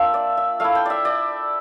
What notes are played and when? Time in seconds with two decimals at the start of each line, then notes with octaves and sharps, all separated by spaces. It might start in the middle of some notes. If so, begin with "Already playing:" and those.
Already playing: A#3 D4 F4 C5 E5 G5
0.14 D5
0.37 E5
0.60 A3 E4 F5
0.75 G5
0.86 D5 E5
1.05 D5